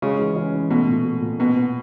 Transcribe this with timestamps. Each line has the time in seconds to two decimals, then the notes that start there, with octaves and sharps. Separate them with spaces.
0.02 C#3 G#3
0.19 E3
0.36 C#4
0.53 E3
0.70 B2 A3
0.88 A#2
1.05 A3
1.21 A#2
1.39 B2 B3
1.56 B3